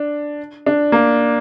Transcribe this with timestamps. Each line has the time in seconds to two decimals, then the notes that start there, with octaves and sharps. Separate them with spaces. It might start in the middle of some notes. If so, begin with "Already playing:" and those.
Already playing: D4
0.66 D4
0.92 A#3